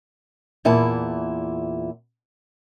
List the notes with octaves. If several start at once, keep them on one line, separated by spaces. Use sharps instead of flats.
E2 A#2 E4 A5